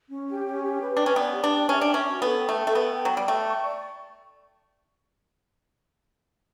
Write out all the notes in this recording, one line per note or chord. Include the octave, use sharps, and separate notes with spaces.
C#4
G4
C#4
G4
B4
D4 G5
C#4
B3 D5
G4
D4
G5
C#4 E5
D4
E5
C#4
F#4
B3 A4
G5
A3
A4
A3
B3 G5
G5
F#3
G5
G3
A3 G5
C#6
D5